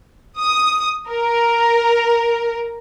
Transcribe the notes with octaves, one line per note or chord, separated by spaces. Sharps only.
D#6
A#4